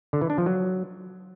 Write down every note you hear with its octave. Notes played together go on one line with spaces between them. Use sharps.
D3
E3
D4
F3
F#3